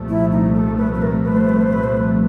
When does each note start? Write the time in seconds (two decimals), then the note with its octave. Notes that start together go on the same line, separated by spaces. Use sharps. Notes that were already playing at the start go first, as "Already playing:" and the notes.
Already playing: C2 A#2 F3 A3
0.09 E4
0.32 D#4
0.54 A4
0.78 B4
0.93 B4
1.02 A#4
1.24 B4
1.37 C5
1.49 B4
1.61 C5
1.73 B4
1.84 C5
1.97 B4